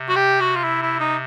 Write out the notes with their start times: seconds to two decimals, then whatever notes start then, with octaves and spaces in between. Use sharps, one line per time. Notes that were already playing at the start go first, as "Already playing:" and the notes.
Already playing: C3
0.09 F#4
0.16 G4
0.40 F#4
0.56 F4
0.64 E4
0.82 E4
1.00 D#4